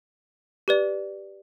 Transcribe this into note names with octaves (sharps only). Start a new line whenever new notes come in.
G4 B4 D5